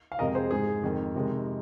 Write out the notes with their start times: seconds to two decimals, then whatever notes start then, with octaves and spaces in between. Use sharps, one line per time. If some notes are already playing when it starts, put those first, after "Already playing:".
0.12 F5
0.19 F2 C3 G#3 A#4 D#5
0.35 G#4 C5
0.51 G#2 G#3 G#4
0.83 F2 D#3 G#3
1.15 F2 C3 D#3 G#3